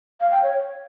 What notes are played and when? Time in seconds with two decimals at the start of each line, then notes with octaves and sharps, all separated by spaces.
0.20 F5
0.32 G5
0.43 C#5